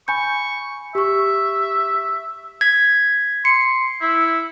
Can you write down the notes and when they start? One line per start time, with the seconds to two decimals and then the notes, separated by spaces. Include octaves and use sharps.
0.08 G#5 B5 C#6 G6
0.95 G4 E5 C#6
2.61 G#6 B6
3.45 C6 C#7
4.01 E4